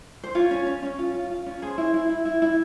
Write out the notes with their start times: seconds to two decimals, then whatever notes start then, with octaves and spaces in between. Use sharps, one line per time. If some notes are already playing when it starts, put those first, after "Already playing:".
0.24 C5
0.35 F4 C#5
0.51 C#4
0.67 C#4
0.83 C#4
0.99 F4
1.14 F4
1.31 F4
1.46 C#4
1.62 G#4 C5
1.78 E4
1.94 E4
2.09 E4
2.25 E4
2.42 E4